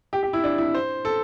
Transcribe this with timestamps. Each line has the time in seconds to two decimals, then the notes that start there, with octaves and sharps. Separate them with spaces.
0.13 G4
0.23 G4
0.33 E4
0.44 D4
0.58 E4
0.75 C5
1.05 A4